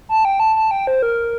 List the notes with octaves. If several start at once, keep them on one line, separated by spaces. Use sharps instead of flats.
A5
G5
A5
A5
G5
C5
A#4